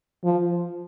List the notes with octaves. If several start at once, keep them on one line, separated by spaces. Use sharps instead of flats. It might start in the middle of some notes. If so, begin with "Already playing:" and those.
F3